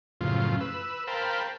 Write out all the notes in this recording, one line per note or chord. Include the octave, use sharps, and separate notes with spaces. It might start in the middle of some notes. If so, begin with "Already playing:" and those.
F#2 A2 C#3 F3 F4
B4 E6
A#4 C5 F5 G5 A5 B5